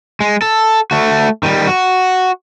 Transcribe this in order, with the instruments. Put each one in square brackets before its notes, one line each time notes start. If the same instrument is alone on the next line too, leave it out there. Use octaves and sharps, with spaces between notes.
[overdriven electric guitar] G#3
A4
A3 F#4
D#3 G3
F#4